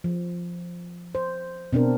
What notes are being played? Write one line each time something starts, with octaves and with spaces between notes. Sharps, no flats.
F3
C5
B2 C4 D4 A#4